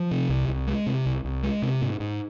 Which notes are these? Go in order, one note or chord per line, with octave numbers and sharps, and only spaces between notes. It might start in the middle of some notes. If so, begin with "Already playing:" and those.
Already playing: F3
C3
C2
C2
G#3
C3
C2
C2
G#3
C3
G#2
G#2